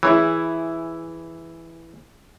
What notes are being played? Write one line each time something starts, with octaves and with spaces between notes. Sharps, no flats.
E3 E4 G#4 C#5